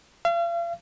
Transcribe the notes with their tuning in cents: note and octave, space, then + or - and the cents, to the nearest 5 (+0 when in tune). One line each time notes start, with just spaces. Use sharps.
F5 -40